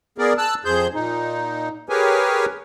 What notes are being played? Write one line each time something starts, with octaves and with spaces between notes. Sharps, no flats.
B3 G#4 A#4 D5
A5 E6 F#6
F2 G#4 C5 G6
A#2 D#4
G4 G#4 A#4 B4 C#5 G#5